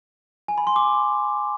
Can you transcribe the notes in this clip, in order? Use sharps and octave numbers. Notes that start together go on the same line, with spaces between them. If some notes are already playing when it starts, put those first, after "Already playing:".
G#5
B5
C6
D6